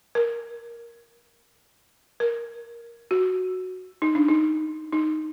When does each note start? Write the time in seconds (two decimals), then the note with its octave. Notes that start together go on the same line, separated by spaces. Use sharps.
0.15 A#4
2.20 A#4
3.11 F#4
4.02 D#4
4.15 D4
4.28 D#4
4.93 D#4